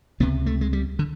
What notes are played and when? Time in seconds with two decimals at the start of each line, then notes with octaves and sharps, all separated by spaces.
0.20 C#2 C3 B3
0.46 A3
0.61 G#3
0.73 G3
0.99 D3